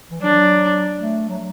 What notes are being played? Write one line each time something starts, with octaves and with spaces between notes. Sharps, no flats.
E3
F#3 D4
A3
F#3